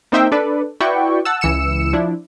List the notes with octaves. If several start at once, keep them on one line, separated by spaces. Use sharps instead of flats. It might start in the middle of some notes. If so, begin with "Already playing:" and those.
A#3 C4 D#4 C5 E5 G5
D4 A4 B4 D5
E4 F#4 B4 D5 G5 C#6
F#5 A5 E6
C#2 E3 E6 C#7 E7
F3 D4 E4